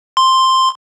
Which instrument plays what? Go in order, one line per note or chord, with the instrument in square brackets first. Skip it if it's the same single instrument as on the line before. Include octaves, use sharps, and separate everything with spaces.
[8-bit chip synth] C6